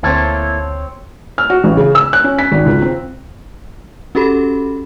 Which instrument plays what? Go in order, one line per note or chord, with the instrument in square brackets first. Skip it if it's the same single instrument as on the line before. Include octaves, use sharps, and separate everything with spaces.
[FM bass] D2 [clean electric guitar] A#3 E4 A4 [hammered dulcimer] C4 C#5 C6
[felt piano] F6
F#4
A1
C#3
E6
F#6
C#4
B6
G#1
C#2
C4
[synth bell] C#4 F#4 G4 A4 B5